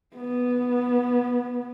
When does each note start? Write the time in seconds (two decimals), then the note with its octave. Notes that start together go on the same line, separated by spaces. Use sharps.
0.16 B3